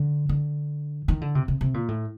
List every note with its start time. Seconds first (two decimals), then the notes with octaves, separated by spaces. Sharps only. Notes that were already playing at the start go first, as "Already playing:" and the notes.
Already playing: D3
0.29 D3
1.08 D#3
1.21 D3
1.35 C3
1.48 C3
1.61 C3
1.74 A#2
1.88 A2